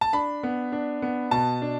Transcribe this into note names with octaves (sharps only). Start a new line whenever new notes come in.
A5
D4 B5
B3
D4
B3
B2 A5
D4